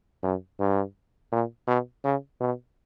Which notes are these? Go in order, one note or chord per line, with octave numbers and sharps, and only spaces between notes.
F#2
G2
A#2
B2
C#3
B2